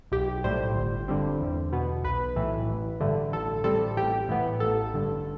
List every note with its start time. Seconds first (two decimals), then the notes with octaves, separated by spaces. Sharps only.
0.12 B1 G4
0.44 A2 G3 C5
0.75 G1
1.08 G2 D3 G3 C4
1.40 E2
1.72 B2 B3
2.04 B1 B4
2.36 A2 E3
2.69 A1
3.00 G2 D3 A3
3.32 A1 A4
3.64 A2 G3 C4 A4
3.97 A1 G4
4.29 A2 E3 B3
4.60 A1 A4
4.94 G2 D3